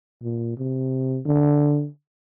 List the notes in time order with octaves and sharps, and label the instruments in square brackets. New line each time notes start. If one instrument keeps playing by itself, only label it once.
[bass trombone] A#2
C3
D3